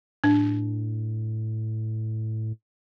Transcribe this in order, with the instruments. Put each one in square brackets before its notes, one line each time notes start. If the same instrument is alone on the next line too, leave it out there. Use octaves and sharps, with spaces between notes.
[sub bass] A2 [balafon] D4